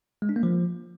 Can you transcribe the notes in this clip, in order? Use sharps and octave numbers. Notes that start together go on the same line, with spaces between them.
G#3
D4
A#3
F3